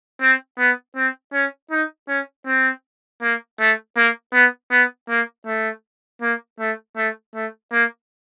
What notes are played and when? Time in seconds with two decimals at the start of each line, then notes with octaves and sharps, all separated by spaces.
0.21 C4
0.59 B3
0.96 C4
1.34 C#4
1.71 D#4
2.08 C#4
2.46 C4
3.22 A#3
3.60 A3
3.96 A#3
4.33 B3
4.71 B3
5.09 A#3
5.46 A3
6.22 A#3
6.59 A3
6.97 A3
7.35 A3
7.72 A#3